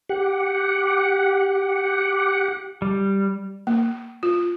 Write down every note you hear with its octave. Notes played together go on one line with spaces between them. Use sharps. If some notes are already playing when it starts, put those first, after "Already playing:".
G4 F#5
G3
A#3
F4